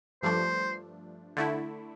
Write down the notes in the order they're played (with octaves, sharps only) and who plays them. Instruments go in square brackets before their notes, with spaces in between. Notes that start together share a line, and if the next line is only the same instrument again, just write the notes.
[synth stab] G2 F3 A3 D4 [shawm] C5
[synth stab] D3 A3 E4